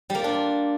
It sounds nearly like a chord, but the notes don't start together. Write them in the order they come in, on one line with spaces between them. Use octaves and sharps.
G3 A#3 F4 D4